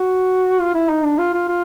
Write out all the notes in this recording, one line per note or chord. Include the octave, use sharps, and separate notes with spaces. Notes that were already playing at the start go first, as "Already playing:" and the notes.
Already playing: F#4
F4
E4
D#4
D4
F4
F4
F4